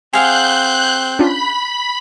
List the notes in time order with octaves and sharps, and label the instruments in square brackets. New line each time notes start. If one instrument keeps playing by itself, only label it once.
[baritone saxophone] C4 [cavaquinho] G#4 F5 F#5 [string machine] F#6 G6
[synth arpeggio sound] C#4 D4 F4 [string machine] B5